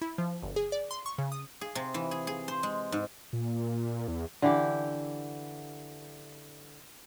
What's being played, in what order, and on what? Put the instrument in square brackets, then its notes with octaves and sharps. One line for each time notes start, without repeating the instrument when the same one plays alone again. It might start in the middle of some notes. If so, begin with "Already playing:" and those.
[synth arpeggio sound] E4
F3
G1
G#4
D5
C6
C#6
C#3
D#6
[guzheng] G#4
C3
E3
G#4
G#4
C5
G#3
G#2
[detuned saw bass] A#2
E2
[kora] D3 E3 G4